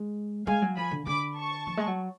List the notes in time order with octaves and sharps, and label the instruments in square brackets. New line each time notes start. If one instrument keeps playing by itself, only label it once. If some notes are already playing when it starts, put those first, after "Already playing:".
Already playing: [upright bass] G#3
[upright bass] G#3 [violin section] F5 G#5
[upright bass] F#3
[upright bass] F3 [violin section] G#5 B5
[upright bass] D3
[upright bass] D3 [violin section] B5 D6
[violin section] A5 C#6
[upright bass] F3
G#3
F#3